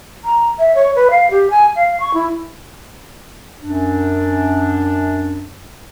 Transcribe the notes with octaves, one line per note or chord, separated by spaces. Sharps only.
A#5
E5
C#5
B4
F5
G4
G#5
F5
C#6
E4
F#2 D4